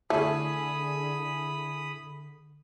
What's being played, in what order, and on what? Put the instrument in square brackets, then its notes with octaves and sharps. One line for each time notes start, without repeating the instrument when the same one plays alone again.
[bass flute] D3 [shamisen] A3 [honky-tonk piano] E4 G#4 [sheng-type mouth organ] B5 D#6